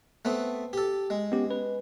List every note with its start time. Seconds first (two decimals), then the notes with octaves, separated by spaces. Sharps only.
0.25 A3 B3 C4
0.73 G4 A4
1.10 G#3
1.32 B3 C#4 G4
1.51 B4